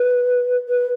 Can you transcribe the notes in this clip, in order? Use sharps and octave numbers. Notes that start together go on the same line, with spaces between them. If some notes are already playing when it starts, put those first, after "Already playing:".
Already playing: B4
B4